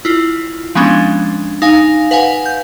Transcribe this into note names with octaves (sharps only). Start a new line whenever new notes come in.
E4 F4
F3 G#3 B3 C#4 D4
D#4 F5 G#5
B4 F5 F#5 G#5
G6